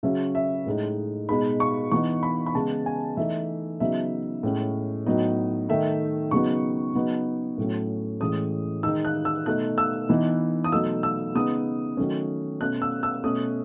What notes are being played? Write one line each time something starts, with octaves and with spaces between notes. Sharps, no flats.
C#3 F#3 C#4 E5
E5
A2 G#3 D#4
B2 G#3 D#4 B5
C#6
E3 B3 D#4 C#6
B5
B5
C#3 G#3 B3 A5
G#5
E3 A3 D#4 E5
C#3 F#3 B3 D#4 E5
A2 G#3 C#4
A2 F#3 B3 D#4 D#5
D#3 A3 D#4 E5
C#3 F#3 B3 D#4 C#6
C#3 F#3 B3 D#4
A2 F#3 A3 C#4
A2 E3 G#3 C#4 D#6
D#3 G#3 D#4 E6
F#6
E6
B2 A3 D#4 F#6
E6
E3 B3 D#4
D#6
B2 F#3 A3 D#4 E6
E6
C#3 G#3 B3 D#4 D#6
D#3 F#3 A3 C#4
B2 A3 C#4 F#6
E6
E6
B2 A3 C#4 D#6